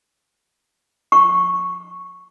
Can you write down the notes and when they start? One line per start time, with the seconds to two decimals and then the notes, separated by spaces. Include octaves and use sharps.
1.12 C#6